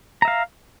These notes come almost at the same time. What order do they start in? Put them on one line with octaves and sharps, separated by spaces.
A#5 E5 F5